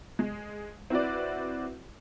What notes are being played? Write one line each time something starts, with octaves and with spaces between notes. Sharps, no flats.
G#3
C4 E4 F#4 B4 D5